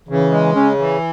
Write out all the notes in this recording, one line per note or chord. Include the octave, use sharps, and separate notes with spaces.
C#3 E3
G#3
C#3 C#4
E3